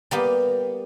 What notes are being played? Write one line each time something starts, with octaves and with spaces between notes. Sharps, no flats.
G3 A#3 B3 G4